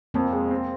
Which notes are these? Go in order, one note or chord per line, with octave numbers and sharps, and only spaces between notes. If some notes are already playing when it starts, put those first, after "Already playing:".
F2 A#3 C4
G#3
C4